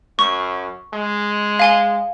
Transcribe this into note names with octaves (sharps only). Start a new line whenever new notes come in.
F#2 C#6
G#3
F5 G#5 G7